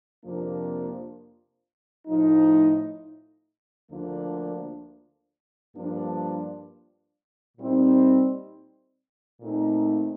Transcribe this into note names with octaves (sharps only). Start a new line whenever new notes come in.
F2 C3 F3 A#3 D4
A2 F3 A3 D#4
D2 D3 F3 A#3 D4
G2 F3 A#3 D4
A#2 G3 C4 D#4
A#2 A3 C4 D#4